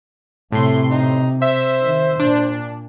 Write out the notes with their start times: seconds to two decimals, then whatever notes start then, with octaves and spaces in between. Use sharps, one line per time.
0.52 A2 C3 A3 C6
0.91 D#4
1.42 C5 E5
1.81 D#3
2.20 A#2 D4